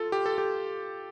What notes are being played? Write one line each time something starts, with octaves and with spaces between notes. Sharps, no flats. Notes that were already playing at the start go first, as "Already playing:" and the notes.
Already playing: F4 A4
G4
A4
G4